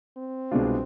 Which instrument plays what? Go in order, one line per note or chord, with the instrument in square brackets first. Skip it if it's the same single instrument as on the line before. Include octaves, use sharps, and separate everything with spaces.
[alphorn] C4
[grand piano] C2 B2 G#3 D4 F4